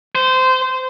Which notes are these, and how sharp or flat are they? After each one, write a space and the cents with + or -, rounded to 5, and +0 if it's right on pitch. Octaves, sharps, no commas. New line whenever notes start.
C5 -20